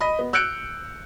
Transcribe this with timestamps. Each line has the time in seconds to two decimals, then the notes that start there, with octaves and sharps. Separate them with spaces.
0.01 D#5 B5
0.19 B3
0.33 E6 F#6 G6 C#7 D7